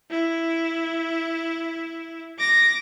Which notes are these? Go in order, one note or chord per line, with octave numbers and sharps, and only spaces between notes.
E4
D6 A#6